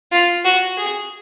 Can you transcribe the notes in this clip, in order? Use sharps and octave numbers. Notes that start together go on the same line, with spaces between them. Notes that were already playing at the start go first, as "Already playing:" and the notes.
F4
F#4
G#4